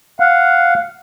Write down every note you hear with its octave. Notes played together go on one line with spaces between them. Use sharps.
F5 F#5